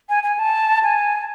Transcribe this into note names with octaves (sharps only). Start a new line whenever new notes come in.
G#5
G#5
A5
G#5